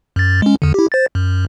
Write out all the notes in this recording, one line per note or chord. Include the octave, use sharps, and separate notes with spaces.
F#2 A6
G#3 C#4
E2 D3
E4 G4
C5 A6
F#2